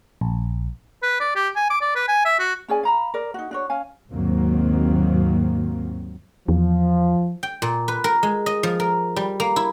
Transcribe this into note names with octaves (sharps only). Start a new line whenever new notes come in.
A#1
B4
D5
G4
G#5
D6
D5
B4
G#5
E5
F#4
C#4 G#4 D5 G#5
F5 A#5 B5
A#4 D5
D#4 F#4
D4 F#4 C#5
C#4 F5 G#5
D#2 G#2 D#3 F#3 A#3 C4
E2 F3
G5
A#2
B4
A#4
G#3
D#5
F3
A#4
G3
A#3
E4